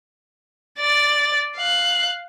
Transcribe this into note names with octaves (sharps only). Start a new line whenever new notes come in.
D5 A6
F5 F#6